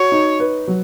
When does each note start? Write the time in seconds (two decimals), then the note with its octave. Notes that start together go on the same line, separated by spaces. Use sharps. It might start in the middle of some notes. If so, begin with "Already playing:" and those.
Already playing: F#4 C#5
0.12 D#4
0.40 B4
0.68 F#3